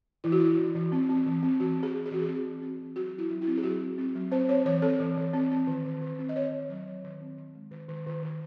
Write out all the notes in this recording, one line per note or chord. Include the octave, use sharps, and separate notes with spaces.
E3 E4
F#4
E3 E4
E3
E3
C4
C4
E3
C4
E3 F#4
C4 G#4
E3
G#4
E3 F#4
G#4
C4
C4
C4
E3
F#3 F#4
F#3
E4
F#3
E4
C4
G#4
F#3 F#4
C4
C4
F#3
C4 C5
C4 C#5
E3 C#5
C4 A4
E3
E3
C4
C4
D#3
D#3
D#3
C4
D#5
C4 C#5
D#3
F#3
F#3
D#3
C4
D#3
G#3
D#3
D#3
D#3
D#3